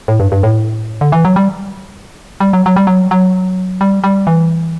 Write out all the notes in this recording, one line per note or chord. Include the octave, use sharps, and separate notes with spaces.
A2
G2
G2
A2
D3
E3
F#3
G3
G3
F#3
F#3
G3
F#3
F#3
G3
G3
E3